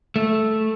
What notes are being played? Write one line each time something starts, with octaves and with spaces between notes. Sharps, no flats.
A3